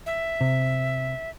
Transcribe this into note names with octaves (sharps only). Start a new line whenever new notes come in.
E5
C3